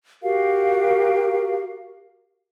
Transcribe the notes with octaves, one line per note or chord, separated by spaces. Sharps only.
F#4 G4 A#4 F5